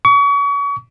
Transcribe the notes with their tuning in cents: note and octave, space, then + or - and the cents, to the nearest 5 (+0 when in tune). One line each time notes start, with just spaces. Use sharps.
C#6 +35